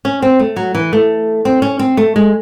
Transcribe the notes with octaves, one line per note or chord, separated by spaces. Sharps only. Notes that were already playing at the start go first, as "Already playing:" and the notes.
C#4
C4
A3
F#3
E3
A3
C4
C#4
C4
A3
G#3